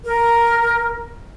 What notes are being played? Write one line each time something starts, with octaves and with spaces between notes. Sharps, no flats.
A#4